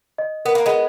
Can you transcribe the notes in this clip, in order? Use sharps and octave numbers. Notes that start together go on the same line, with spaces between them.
D#5
B3 A#4
A#3
G#3 B3
D#5